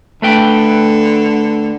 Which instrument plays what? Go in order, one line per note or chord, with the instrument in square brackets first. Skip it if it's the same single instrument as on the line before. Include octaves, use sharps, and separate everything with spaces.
[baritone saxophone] D3 [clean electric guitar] A3 B4 G5